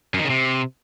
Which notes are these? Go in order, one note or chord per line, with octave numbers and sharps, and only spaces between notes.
F#2
D#3
C#3
C3